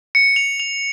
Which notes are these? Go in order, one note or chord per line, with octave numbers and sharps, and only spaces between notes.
C#7
F7
F7